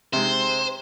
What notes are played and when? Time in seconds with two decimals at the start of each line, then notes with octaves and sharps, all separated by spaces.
0.13 C3 G#3 C5